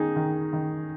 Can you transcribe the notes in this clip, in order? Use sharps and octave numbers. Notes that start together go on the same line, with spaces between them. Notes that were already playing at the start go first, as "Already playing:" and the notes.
Already playing: D#3 C#4 D#4 G#4
D#3
D#3